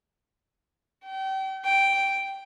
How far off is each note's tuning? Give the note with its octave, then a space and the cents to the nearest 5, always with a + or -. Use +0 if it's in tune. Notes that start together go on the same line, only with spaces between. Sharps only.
G5 -35
G5 +0